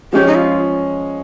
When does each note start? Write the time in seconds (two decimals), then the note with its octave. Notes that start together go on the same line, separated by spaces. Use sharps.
0.13 F3 G#3 C#4 G4
0.27 D#4
0.35 F4